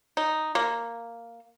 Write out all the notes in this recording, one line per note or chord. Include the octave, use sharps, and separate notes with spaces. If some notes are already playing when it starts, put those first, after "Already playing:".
D#4
A#3